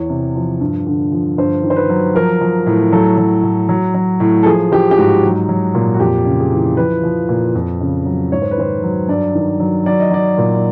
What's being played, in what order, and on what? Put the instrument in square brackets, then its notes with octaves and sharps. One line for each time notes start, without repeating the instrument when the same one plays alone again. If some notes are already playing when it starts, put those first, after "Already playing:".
Already playing: [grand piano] E2 C#5
C3
F3
G2
D3
F3
G2 C5
D#3
C5
B4
F#3
F3 A#4
F3
A2
F#3 A4
F#3
A2
F#3
F#3
A2
A4
F3 G#4
F3 G4
G4
G#2 F#4
F#3
F#3
A#2
F#4
F2 G4
C#3
G#4
E3
F3 B4
F3
A#2
F2
C#3
F#3
G#2 C#5
C5
B4
D#3 C5
F#3
G2 D5
D#3
F#3
F#3 D5
D#5
F#3 D5
A#2